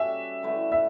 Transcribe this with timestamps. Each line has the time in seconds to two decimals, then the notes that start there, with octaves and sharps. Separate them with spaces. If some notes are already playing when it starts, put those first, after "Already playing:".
Already playing: G3 C#4 F#4 A4 E5
0.43 D3 A3 E4 B4
0.72 E5